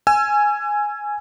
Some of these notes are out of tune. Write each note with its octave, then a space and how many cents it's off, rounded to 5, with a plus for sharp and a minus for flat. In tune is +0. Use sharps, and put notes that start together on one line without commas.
G#5 +0 E6 +35